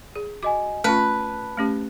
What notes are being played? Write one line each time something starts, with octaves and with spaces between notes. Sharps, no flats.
G#4
F#4 D#5 G#5 D6
A3 C#4 F4 B4 A5
A3 C#4 G4